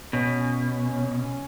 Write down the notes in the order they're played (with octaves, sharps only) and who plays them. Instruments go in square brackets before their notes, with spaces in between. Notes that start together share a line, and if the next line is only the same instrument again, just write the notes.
[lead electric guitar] B2 [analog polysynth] C#4